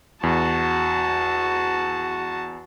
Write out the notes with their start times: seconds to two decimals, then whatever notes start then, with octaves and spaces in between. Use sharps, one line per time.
0.23 E2 F#4 A5